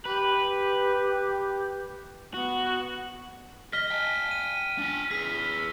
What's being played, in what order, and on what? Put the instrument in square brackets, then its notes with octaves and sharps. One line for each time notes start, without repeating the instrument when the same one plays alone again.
[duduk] G4 [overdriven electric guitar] B4
[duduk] B3 [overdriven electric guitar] F#4
[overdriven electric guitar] D#5 [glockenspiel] F6 B6 G7
[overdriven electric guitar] G5 G#5
[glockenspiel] D#7
[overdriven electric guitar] D4 G#5
[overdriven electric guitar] G#4 B4 [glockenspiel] B6